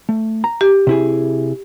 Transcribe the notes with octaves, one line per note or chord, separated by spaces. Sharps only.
A3
A#5
G4
C3 E4 G#4